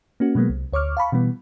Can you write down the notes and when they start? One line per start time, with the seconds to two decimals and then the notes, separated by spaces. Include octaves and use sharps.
0.20 A#3 C#4 F#4
0.35 B2 F#3 G#3 A#3 B3
0.50 C2
0.73 D2 C#5 C#6 D6 F6
0.97 F5 A5 B5 C#6
1.12 B2 E3 G3 B3